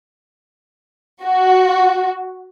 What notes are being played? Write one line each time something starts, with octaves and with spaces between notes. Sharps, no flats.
F#4